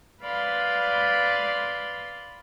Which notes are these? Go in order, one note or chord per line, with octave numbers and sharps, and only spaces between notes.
B4 D5 F5 B5 C6